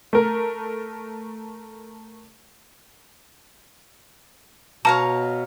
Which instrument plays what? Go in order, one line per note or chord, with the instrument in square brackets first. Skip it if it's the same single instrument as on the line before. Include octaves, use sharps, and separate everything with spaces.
[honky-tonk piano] A3 A#4
[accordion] B2 [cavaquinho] C#5 F5 A#5 [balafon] A5